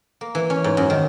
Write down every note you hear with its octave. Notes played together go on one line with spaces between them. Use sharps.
A#3
E3
C#4
G#2
F#2
D#3